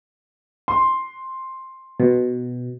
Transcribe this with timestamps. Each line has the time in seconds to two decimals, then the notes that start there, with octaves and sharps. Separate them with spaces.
0.68 C6
2.00 B2